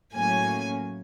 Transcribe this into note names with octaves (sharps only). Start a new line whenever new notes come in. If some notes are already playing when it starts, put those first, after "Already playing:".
A2 F#3 A#3 C#4 G#5